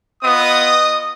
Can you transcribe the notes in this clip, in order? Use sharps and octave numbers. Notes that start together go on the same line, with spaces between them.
B3 F4 D#5 D#6